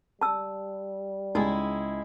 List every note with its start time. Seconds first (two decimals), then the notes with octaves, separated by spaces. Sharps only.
0.21 G3 A5 E6
1.35 C#2 G#3 D#4 E4 G#4